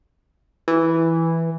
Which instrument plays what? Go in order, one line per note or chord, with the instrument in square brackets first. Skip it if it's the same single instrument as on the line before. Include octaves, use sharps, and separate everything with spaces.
[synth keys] E3